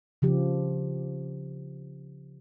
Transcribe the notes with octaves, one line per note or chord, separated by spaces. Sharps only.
C#3 F3 G4